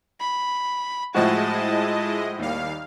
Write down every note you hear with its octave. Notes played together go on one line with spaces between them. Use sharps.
B5
A2 F3 G#3 E4 F#4 D#5 A5
D#2 G3 F5